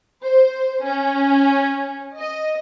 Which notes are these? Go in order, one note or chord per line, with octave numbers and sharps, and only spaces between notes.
C5
C#4
D#5